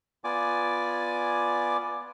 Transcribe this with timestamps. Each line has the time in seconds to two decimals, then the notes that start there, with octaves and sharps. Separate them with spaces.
0.24 B3 F4 D5 G#5 D6